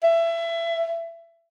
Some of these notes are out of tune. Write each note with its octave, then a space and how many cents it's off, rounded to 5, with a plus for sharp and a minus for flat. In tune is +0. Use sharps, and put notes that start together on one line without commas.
E5 +25